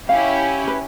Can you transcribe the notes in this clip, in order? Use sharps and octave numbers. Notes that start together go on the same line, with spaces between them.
C#4 E4 G4 F5
B4